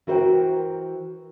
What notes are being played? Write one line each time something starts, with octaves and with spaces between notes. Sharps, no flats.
E3 F#4 A#4 C5 F5 G5